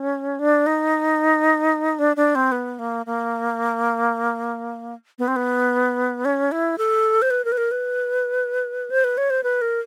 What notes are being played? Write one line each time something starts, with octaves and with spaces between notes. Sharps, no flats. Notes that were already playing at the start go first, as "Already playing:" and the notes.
Already playing: C#4
D4
D#4
D4
D4
C4
B3
A#3
A#3
B3
C4
B3
C#4
E4
A4
C5
B4
A#4
B4
A#4
B4
C5
B4
C#5
C5
B4
A#4